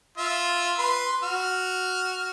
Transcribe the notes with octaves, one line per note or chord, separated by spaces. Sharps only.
F4 E5
B4 C6
F#4 F6